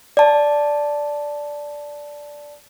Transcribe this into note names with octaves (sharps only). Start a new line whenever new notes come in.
D5 A5